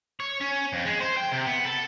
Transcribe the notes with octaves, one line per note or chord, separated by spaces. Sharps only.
C#5
C#4
F2
G#3
C5
G5
C3
B3
A4